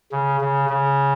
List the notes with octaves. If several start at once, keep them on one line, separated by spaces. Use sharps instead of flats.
C#3
C#3
C#3